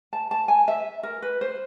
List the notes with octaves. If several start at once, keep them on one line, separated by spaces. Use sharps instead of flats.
A5
A5
G#5
E5
A#4
B4
C5